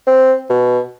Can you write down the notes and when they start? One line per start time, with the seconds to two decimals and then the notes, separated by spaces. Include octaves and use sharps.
0.07 C4
0.50 B2